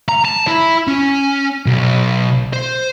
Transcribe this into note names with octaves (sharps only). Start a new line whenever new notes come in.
A#5
A5
E4
C#4
B1
C5